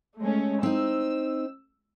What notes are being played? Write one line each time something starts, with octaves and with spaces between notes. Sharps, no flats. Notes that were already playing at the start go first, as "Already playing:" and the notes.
G#3 A3 C#4
C4 D#4 E6